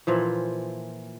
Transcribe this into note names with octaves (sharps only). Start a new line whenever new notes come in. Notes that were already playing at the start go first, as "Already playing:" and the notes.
A#2 E3 F3